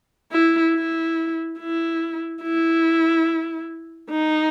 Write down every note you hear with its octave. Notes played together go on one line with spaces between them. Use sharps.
E4
E4
E4
E4
D#4